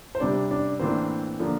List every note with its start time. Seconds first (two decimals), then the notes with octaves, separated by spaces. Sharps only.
0.15 C5
0.20 C3 G3 D4 D5
0.51 D4 D5
0.80 A2 E3 A#3 C4 D4 C5
1.39 D3 F3 A#3 D4